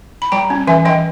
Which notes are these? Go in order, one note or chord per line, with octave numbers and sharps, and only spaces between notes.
B5
G3 G5 A#5
C#4
E3 E5 G#5
E3 D#5 G5